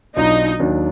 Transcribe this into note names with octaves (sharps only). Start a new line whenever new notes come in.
B1 B2 F#3 D4 D#4 F4
D#2 D#3 F#3 D4